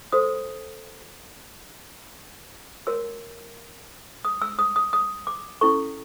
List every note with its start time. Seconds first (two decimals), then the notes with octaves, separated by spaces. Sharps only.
0.12 F#4 A4 C5 D#6
2.87 F#4 A#4 C#5 E6
4.25 D#6
4.42 E6
4.59 D#6
4.76 D#6
4.93 D#6
5.27 D6
5.61 C#4 E4 A4 C#6